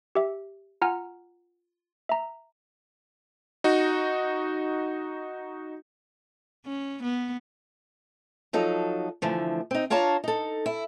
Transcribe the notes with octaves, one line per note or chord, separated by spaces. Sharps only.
G4 E5
F4 F#5 G#5 A#5 F6
E5 A#5
D#4 F#4
C#4
B3
F3 F#3 D#4 A4
D3 E3 F3 A3
C4 D#4
D4 F4 C#5 A5 A#5
D#4 A4
E4